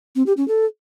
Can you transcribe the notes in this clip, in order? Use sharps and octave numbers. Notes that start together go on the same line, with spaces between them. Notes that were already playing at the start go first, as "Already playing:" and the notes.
C4
G4
C#4
A4